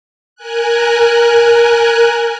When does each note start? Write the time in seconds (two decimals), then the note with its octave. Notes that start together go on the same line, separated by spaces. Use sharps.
0.36 A#4 G#5 F#6